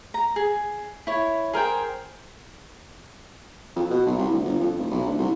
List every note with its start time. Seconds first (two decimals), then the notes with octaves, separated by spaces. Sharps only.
0.14 A#5
0.36 G#4
1.07 E4 C#5
1.53 G#4 A#4 C5 G5
3.76 F2
3.90 B2
4.06 B1
4.18 C2
4.31 D2
4.45 G1
4.60 F2
4.79 F1
4.91 B1
5.06 D2
5.18 C2